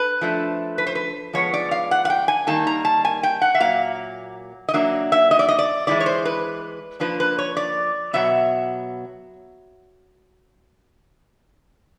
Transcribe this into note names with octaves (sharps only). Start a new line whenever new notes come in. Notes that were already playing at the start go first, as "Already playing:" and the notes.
Already playing: B4
F3 A3 D4
B4
C5
B4
A2 F3 G#3 B3 C#5
D5
F5
F#5
F#5
G5
G#5
D#3 G3 A#3 D#4 A5
A#5
A5
G#5
G5
F#5
E5
A#2 F#3 A#3 F5
D#5
F#3 A#3 D4 E5
E5
D#5
D5
D#5
D5
E3 G#3 C4 E4 D5
C#5
C5
B4
F3 A#3 D4 B4
B4
C#5
D5
B2 F#3 B3 E5